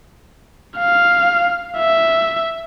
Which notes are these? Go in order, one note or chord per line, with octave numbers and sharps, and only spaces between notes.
F5
E5